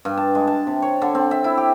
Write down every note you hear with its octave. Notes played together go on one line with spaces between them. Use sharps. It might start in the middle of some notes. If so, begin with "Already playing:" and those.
G2
A5
G#3
A5
C3
C#5
D3
C4
E5
E4
G4